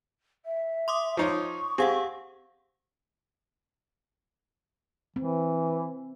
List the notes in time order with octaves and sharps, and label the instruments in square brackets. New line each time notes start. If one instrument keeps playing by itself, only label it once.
[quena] E5
[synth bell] C6 D6 D#6
[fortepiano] F3 D#4 C#5 [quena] C#6
[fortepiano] C4 G#4 [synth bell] G4 F5 F#5
[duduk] E3 [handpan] C4